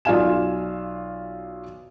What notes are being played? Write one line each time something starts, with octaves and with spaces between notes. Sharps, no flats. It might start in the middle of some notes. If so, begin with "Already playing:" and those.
B1 F4 D5 F5 G#5 E7